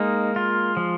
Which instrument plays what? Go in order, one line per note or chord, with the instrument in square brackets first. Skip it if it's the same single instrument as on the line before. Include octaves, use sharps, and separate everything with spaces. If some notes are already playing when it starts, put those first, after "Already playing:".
Already playing: [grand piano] G#3 [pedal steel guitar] A#3 D#4
[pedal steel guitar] F4
F3